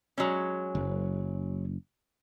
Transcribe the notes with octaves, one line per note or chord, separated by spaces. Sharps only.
F#3 G#3 C#4
F#1